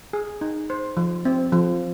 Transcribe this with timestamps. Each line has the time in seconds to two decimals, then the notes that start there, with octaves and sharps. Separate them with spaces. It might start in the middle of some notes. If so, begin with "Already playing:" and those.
0.13 G#4
0.41 D#4
0.70 C5
0.97 F3
1.25 C4
1.52 F3